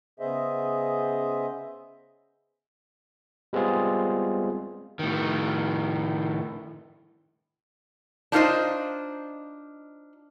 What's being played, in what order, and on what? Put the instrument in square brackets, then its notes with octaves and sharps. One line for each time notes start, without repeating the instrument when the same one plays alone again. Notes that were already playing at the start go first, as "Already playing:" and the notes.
[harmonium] C#3 B3 G#4 C5 D#5 E5
[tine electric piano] G3 G#3 B3 C4 F4 G#4
[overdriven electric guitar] A2 D#3
[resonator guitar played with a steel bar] D4 D#4 F4 A#4 C5 D#5